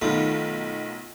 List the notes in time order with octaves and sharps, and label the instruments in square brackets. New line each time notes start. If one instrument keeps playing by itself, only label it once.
[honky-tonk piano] B1 D#3 [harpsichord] A3 B3 F4